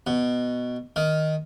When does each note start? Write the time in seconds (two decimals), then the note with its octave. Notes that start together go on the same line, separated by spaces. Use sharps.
0.07 B2
0.96 D#3